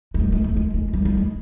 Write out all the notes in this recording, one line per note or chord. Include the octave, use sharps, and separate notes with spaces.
G#3
G3
G#3
A3
G#3
G#3
G3
G3
G#3